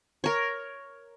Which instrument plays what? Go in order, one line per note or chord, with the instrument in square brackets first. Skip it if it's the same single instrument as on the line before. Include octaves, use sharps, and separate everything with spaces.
[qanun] A#4 C#5